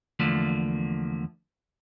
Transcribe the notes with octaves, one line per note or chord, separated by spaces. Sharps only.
E2 D3 F3 A3 A#3